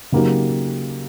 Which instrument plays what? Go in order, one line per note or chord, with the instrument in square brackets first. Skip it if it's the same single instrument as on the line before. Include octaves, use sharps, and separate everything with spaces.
[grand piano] C#3 F#3 A#3 D#4 G4